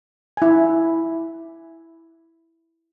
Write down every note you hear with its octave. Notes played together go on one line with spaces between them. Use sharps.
E4 G#5